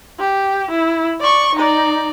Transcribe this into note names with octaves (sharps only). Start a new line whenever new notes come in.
G4
E4
D5 C#6
D#4 D5